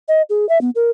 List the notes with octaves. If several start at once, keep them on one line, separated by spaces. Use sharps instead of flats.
D#5
G#4
E5
B3
A#4